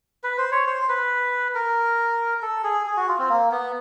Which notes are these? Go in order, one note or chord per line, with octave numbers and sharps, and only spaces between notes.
B4
C5
C#5
C5
B4
A#4
A4
G#4
G#4
F#4
F4
C4
A#3
B3